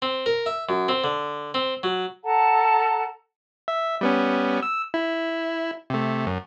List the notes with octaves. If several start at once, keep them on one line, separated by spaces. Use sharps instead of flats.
C4
A#4
E5
F#2
C4
D3
C4
F#3
A4 F#5 A5 A#5
E5
G3 B3 C#4
E6
E4
C3 A3
F#2